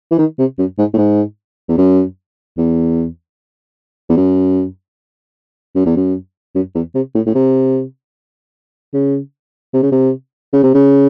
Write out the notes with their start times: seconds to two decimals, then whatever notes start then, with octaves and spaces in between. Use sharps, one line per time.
0.11 E3
0.19 D#3
0.39 C3
0.58 F#2
0.78 G#2
0.94 A2
0.98 G#2
1.68 E2
1.78 F#2
2.58 E2
4.09 E2
4.16 F#2
5.75 F#2
5.85 E2
5.96 F#2
6.55 F#2
6.75 E2
6.95 C3
7.15 A2
7.26 A2
7.34 C3
8.94 C#3
9.73 C3
9.83 C#3
9.92 C3
10.53 C#3
10.63 C3
10.74 C#3